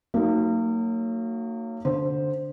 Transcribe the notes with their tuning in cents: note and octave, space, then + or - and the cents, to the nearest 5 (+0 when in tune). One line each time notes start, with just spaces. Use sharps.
F#3 +0 A#3 -35 D#4 +0
D3 +0 C5 +0